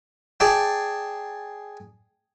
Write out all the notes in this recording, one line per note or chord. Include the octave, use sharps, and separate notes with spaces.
G#4 D5 G5 A5